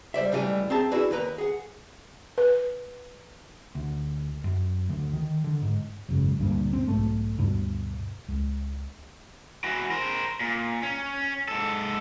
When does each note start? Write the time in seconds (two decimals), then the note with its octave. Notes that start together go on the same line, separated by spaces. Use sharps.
0.14 G3 C5 D5 E5
0.32 C#2 A2 E3 G3 G#4 G#5
0.70 C4 G#4 E5 A5 A#5
0.91 D4 E4 F#4 G#4 B4 D5
1.11 D#2 A#4 B4 A#5
1.38 G#4 F#5
2.38 B4
3.75 D2
4.44 F#2
4.89 D2
5.13 D#3
5.44 D3
5.62 G#2
6.09 G#1 F#2 C#3
6.39 D2 G2 A#2
6.73 C4
6.88 B1 G#2 A3
7.38 D2 G2 B2
8.28 C#2
9.64 E3 F#4
9.91 A#4 C5
10.40 A#2
10.83 C#4
11.48 G#2 A4